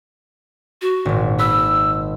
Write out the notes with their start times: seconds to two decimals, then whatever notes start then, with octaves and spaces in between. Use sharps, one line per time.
0.82 F#4
1.05 G#1 A#2
1.39 B4 E6